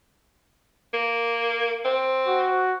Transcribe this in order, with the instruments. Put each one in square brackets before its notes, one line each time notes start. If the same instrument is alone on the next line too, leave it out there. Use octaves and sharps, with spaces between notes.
[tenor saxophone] A#3
C4
[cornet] F#4